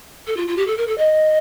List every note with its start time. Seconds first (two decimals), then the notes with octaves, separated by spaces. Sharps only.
0.27 A4
0.37 F4
0.48 F4
0.57 G4
0.67 A4
0.78 A#4
0.87 A4
0.98 D#5